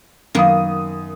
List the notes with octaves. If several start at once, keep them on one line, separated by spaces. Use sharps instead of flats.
F#2 D#3 A#3 B3 D#6